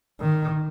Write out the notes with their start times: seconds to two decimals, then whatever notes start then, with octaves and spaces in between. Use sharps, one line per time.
0.20 D#3